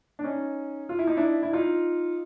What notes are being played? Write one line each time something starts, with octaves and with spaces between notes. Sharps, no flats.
D4
C#4 D#4
F4
E4
D#4
D4 E4
E4
D#4 F4